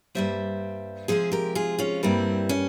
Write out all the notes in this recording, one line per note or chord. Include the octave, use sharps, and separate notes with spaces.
G2 G3 A#3 C5 E5
C3 F3 G#3 G#4 C5
G4 A#4
F4 G#4
C#4 F4
G2 G3 A#3 C4 E4
C#4